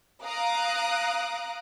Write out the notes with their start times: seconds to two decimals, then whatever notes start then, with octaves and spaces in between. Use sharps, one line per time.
0.24 F5 A#5 D#6 F#6 D7